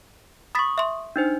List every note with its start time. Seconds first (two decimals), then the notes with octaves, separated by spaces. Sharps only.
0.55 B5 C#6 D#6 A6 B6
0.78 E5 C6
1.16 D4 D#4 C5